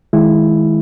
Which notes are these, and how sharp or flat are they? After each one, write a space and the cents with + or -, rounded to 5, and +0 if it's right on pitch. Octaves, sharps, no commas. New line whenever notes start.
D#3 +20 G#3 +15 E4 +0